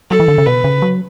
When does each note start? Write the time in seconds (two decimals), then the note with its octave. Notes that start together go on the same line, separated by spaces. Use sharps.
0.11 F#3 A4
0.20 E3
0.28 D3
0.38 C#3
0.46 B2 B4
0.64 C#3
0.82 F#3